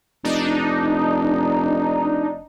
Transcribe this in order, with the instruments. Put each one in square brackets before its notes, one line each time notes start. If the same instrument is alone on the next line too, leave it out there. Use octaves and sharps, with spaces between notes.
[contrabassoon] F1 [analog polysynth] D4 D#4